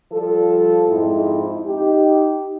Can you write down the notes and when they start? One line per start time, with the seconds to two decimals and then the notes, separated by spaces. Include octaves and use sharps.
0.12 F3 G3 A4
0.89 F2 G#2 C4 E4
1.65 D#4 G4